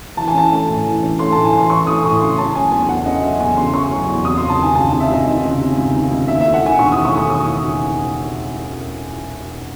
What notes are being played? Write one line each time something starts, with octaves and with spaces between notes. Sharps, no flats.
E3 A5
G#5
C#4 A5
A3
A2
E3
C#4
A3 C6
A2 A5
G#5
E3 C6
C#4 C#6
A3 D#6
A2 C#6
C#3 C6
C#4 A5
F#3 G#5
E2 G#5
C#3 F#5
C#4 D#5
F#3 E5
E2 G#5
C#3 C6
C#4 C#6
F#3
E2
C3 D#6
C#2 C6
A5
D#3 G#5
C#2 A5
C3
E5
C#2 D#5
D#3
C#2
C3
C#2
D#3
C#2
D#2 E5
A3 E5
F#5
D#3 G#5
E1 C#6
D#2 D#6
C#6
A3
C#6
D#3 D#6